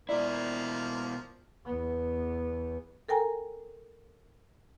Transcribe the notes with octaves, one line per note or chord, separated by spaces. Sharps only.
B2 F3 A#3 E4 A#4 D5
E2 B3
A4 A#4 G5 G#5 A#5